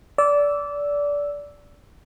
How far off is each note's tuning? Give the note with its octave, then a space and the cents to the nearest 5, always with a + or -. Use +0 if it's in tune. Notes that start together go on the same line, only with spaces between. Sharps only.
D5 -20 E6 +0